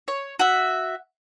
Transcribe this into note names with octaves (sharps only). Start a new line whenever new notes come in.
C#5
F#4 E5